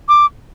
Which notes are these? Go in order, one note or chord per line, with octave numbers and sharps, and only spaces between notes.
D6